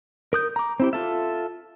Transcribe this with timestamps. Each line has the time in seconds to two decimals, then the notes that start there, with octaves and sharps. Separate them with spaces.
0.33 A#4 D#6 G6
0.56 A#5 D6
0.80 C4 E4 G4
0.93 F4 A4 E5